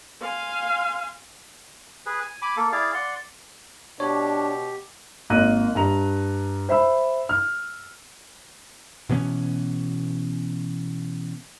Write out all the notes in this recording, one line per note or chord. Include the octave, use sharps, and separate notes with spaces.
F5 G#5 C6
G#4 B4
G#5
G#5 B5 D6
A#3 A4
E4 G#4 D5 F5
D5 F#5 C6
B2 D4 G4 C#5
G#1 A#3 D#5 F5 F#6 D#7
G2 A#5 F7
C5 E5 B5 E6
F6
B2 E3 B3 C#4